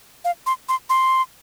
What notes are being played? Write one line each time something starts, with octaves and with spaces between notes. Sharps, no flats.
F5
C6
C6
C6